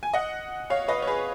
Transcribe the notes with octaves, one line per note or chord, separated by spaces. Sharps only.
G#5
D#5 F#5
C#5 F5
B4 D#5
C#5
G#4 B4